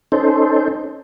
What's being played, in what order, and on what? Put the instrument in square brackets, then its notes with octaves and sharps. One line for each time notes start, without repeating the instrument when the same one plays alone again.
[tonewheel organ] C#4 D#4 A4 C5